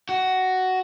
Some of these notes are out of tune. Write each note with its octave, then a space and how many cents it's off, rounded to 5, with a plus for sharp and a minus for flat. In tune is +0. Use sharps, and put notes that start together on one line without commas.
F#4 +10